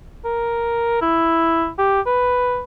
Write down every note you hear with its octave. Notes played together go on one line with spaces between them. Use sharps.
A#4
E4
G4
B4